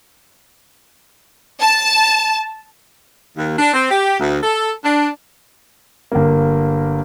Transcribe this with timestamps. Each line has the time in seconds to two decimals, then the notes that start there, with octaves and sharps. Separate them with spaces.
1.61 A5
3.36 D#2
3.58 D4
3.74 C4
3.91 G4
4.20 D2
4.43 A4
4.84 D4
6.12 G1 A#3